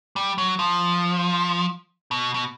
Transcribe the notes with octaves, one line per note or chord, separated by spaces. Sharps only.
G3
F#3
F3
B2
B2